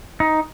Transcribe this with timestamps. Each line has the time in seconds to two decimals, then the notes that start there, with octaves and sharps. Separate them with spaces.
0.20 D#4